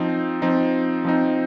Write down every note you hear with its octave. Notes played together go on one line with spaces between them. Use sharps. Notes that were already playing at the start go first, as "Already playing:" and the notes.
Already playing: F3 C4 D#4
F3 C4 D#4
F3 C4 D#4